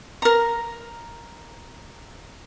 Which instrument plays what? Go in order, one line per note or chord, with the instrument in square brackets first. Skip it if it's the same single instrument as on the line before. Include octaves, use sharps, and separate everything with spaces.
[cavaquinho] A#4 A#5